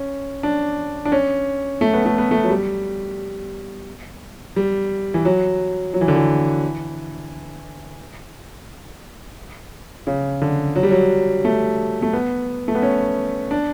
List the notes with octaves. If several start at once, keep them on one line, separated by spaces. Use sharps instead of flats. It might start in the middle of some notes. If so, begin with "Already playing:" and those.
Already playing: C#4
D4
D4
C#4
A3
B3
A3
B3
A3
F#3
G3
G3
E3
F#3
F#3
E3
D3
E3
C#3
D3
F#3
G3
F#3
A3
A3
B3
A3
B3
C#4
D4